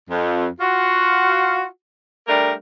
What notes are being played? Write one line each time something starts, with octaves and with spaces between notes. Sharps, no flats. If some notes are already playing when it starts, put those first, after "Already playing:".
F2
F4 F#4
G3 A3 D4 A#4